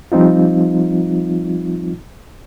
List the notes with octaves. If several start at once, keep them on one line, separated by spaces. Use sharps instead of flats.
F3 G3 C4 D#4 F4